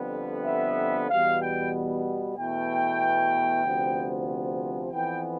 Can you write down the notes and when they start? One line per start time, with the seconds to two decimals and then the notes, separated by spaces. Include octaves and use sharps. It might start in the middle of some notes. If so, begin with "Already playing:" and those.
Already playing: F2 D3 G3 B3
0.45 E5
1.09 E2 B2 G3 B3 F5
1.41 G5
2.36 E2 B2 A3 G5
3.64 D2 C3 F3 B3
4.91 F2 E3 B3 G5